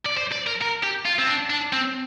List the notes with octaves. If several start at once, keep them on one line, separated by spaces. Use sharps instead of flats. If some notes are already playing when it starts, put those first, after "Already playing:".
D5
C5
D5
A#4
A#4
G4
F4
C4
D4
D4
C4